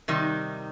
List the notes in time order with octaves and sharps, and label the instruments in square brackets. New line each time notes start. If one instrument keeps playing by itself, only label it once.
[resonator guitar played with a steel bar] C3 D#3 G3 D#4